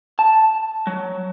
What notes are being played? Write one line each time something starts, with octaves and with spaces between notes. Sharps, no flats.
A5
F#3